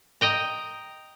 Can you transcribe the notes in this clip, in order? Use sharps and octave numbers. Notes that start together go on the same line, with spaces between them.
D#5 G5 A#5